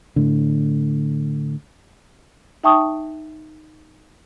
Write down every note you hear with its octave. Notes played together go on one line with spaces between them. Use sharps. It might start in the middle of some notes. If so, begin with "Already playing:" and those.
A2 D3
D#4 E5 G5 A5 C#6 D#6